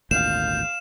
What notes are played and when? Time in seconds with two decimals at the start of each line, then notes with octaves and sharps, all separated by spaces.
0.11 G#1 D2 A#2 F5 G6 E7